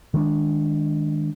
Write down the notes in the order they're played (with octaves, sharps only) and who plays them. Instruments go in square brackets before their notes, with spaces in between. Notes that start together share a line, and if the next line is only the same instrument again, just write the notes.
[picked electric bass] D#3 G#3 D4